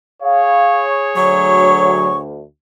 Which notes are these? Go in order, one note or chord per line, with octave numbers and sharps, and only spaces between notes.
G#4 C#5 F5
D2 F#3 C#6